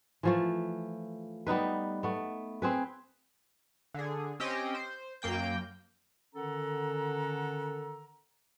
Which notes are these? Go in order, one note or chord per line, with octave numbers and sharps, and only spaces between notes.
E3 F3 A3
G3 B3 D#4 B4
A3 B3
C4 G#4 B4
D3 G#4
C4 C#4 G4 D#5 G5
C5
F#2 A#3 G5 G6
D3 D#3 C#4 A4 F#5 A#5